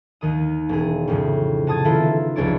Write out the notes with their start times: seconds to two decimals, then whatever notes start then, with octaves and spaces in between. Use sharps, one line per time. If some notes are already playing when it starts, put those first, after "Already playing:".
0.21 D#2 D#3 D#6
0.69 E1 G#4
1.07 F2 A2 C#3
1.67 C3 A5 D#6 G#6
1.85 D#3 A3 B3 E4 F4 A4
2.36 F1 C#2 D4 C#5 D5